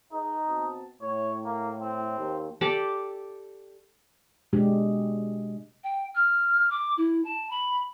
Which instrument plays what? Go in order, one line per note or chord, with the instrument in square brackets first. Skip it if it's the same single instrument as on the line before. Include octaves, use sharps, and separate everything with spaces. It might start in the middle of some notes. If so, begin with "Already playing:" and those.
[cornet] D#4 [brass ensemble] G#4 B4 D#5
[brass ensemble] B2 C4 A5
[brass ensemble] A2 [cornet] C#5
[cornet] A#3
C4
[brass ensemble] D#2
[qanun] G4 A4 D5
[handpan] B2 G#3 D4 G4
[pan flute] G5
F6
D6
E4
A5
B5